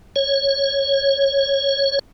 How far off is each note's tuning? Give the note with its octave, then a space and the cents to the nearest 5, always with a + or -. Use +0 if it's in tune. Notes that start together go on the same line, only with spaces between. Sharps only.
C#5 -10